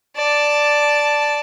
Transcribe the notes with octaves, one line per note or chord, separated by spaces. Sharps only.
D5 A5